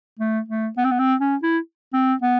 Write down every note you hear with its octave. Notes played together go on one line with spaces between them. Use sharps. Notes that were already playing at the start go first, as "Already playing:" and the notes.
A3
A3
B3
C4
B3
C4
C#4
E4
C4
B3